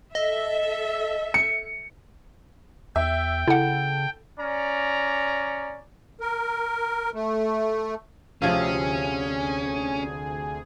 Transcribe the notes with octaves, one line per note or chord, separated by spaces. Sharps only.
A4 D#5 E5
C#7
E2 E5 G5
C#3 E4 A4 F#5
C#4 D5 A#5
A#4
A3
D2 C3 F3 C#4 G#4 F5